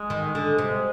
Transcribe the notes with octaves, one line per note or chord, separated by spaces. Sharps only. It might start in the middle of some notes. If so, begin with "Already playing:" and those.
Already playing: G#3
D#3
D3
C3